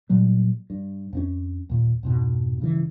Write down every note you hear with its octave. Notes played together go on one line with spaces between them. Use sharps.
A#2 F#3 G3
G2
F2 C4 C#4
D#2 A#2
F2 G#2 B2
G2 C#3 E3